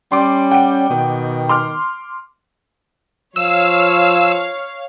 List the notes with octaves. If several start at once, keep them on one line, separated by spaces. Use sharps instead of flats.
G3 C#4 C6 D6
F#5 G5 D7
B2 D#3
C6 D6 F6
F3 C#5 F5 E6